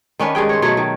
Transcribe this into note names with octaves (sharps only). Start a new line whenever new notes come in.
D#3 C#4 D4 B4
G2 G#3 G#4 G5
C5 C#5
B2 F#3 A3 C#5
D#3